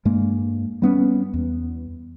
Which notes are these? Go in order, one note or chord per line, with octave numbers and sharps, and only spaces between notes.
G2 G#3 A#3
G3 B3 C#4
E2